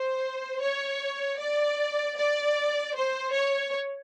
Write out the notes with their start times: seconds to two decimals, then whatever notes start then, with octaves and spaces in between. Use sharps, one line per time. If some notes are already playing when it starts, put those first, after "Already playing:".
Already playing: C5
0.62 C#5
1.39 D5
2.17 D5
2.95 C5
3.33 C#5